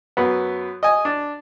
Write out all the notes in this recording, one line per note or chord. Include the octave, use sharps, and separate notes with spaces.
F#2 B3
D#5 G#5
D4